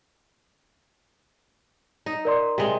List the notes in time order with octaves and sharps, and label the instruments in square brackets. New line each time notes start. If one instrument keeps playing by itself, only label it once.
[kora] D#4
[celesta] A#4 D5 C6
[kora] C3 G#3